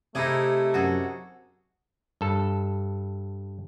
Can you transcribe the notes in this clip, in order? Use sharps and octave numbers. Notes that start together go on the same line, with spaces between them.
C3 A3 D#4 E4 G#4
F#2 F#4 G#4 A4
G2 A4